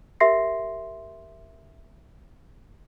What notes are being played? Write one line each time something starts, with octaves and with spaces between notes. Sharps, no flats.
G4 A#4 E5 C6 A#6 C7